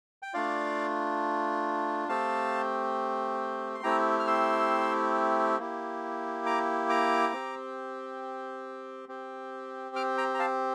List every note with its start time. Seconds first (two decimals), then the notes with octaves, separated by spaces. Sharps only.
0.22 G5
0.34 A3 D4 F4 D5 F5
2.09 A3 C4 G4 F5 A5
3.75 C6
3.83 A3 C4 E4 G4 G5 A#5
4.20 F6
4.27 C6 E6
5.59 A#3 E4 G4
6.46 A#5 D6
6.89 A#5 D6
7.33 C4 G4
9.09 C4 G4
9.96 D6 F6
10.17 G5 A#5
10.34 A#5
10.39 F5 A5